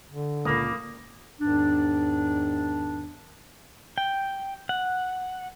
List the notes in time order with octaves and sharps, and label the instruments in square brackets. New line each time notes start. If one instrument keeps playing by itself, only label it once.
[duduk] D3
[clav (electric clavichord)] C#2 A#2 [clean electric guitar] A#3 [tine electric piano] B5 D6 D#6
[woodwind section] E2 G#2 D#3 D4
[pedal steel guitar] G5
F#5